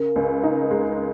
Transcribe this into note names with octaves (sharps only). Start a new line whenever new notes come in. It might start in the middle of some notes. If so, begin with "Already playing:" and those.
Already playing: C#3 A#4
C#2
D#4
G#3